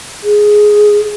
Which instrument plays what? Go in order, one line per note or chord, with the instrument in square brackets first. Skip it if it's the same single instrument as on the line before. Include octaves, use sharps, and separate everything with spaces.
[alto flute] G#4